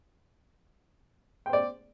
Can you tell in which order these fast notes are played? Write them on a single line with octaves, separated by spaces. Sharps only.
G5 C5 D5